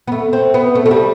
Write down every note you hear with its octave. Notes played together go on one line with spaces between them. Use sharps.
B3
A3
C4
B3
A3
A3
G3